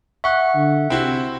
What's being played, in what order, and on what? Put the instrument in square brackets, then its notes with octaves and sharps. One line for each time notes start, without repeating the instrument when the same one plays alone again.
[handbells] E5 F#5 F#6 [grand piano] C#6
[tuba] D3
[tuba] C3 [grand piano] C4 E4 F#4